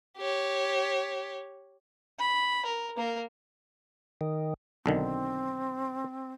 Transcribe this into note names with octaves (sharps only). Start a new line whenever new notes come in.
G4 C#5
B5
A#4
A#3 A#4
D#3
B1 D3 D#3 C4